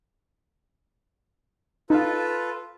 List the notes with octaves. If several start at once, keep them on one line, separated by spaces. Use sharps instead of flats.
D#4 F4 A4 B4 F5